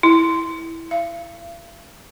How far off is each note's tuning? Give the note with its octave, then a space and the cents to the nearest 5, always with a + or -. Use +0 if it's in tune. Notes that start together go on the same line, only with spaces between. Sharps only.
E4 -5
F5 -45